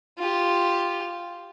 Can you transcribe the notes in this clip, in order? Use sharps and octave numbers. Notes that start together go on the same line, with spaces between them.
F4 G4